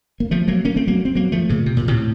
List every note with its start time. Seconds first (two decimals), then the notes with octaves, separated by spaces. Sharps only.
0.20 A#3
0.31 F3 A3
0.48 F#3 A#3
0.65 A#3 C#4
0.76 A3 C4
0.87 F#3 A#3
1.05 C4
1.15 F#3 A#3
1.32 F3 A3
1.49 A#2 C#3
1.66 C3
1.77 A#2
1.88 A2 C3